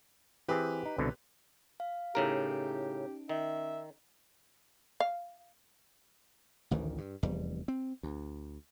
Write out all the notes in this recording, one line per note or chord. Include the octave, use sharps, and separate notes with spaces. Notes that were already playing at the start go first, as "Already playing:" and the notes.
E3 C4 G4 G#4 B4
D#4
C2 B2 D3
F5
A2 C#3 C#4 D#4 G4 A#4 D7
D#3 E5
F5
A1 D2 D#3 E3
G2
F1 E2 G3
C4
D2